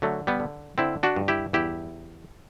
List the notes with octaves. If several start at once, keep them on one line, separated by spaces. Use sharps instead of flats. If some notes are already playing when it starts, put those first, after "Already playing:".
D3 F#3 A3
G3 B3
D3
D3 C4 E4
D4 F#4
G2
E4 G4
E2 E4 G4